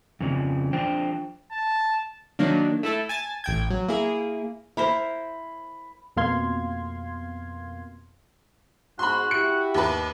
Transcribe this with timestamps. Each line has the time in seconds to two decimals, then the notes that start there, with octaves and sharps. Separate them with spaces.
0.21 F2 C#3 F3
0.73 F3 D4 F4 C5 G5
1.52 A5
2.39 D#3 F#3 A#3 D4
2.83 A3 E4 A4
3.09 G#5 A5 A6
3.44 A1 G5 G#6
3.70 F#3
3.88 A#3 E4 G#4
4.77 E4 A#4 C5 B5
6.16 F2 B2 A#3 F5 C6 G#6
8.99 G#2 F#4 B5 C6
9.31 E4 G4 C#7
9.74 D#2 B4